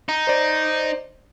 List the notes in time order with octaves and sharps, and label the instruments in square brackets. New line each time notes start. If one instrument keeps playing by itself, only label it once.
[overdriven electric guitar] D#4
[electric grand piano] C5 D5